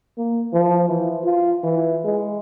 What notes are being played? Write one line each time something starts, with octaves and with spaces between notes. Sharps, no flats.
A#3
F3
E3
F4
E3
G#3